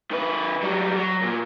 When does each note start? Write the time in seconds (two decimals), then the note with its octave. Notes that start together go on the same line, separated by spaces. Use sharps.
0.11 D#3 B4
0.62 F#3 G3
0.96 F#3
1.22 A#2